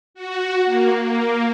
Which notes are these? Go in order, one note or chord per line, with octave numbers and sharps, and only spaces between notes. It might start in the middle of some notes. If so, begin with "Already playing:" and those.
F#4
A#3
A#3